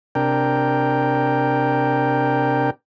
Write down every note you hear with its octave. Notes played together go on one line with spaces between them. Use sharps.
C3 D4 A#4 G5